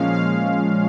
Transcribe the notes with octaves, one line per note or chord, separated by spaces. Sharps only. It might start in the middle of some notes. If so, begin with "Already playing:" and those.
Already playing: A#2 F3 G#3 C#4 F5
F5